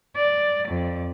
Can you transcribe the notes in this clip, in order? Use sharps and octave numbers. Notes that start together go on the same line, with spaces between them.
D5
F2